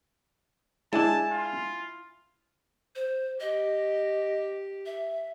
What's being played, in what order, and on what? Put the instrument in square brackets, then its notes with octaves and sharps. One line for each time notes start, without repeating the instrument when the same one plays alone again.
[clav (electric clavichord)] G#3 D4 [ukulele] E4 G#5 [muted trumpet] A5
[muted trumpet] F4
[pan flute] C5
[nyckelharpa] G4 [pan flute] D#5
[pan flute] E5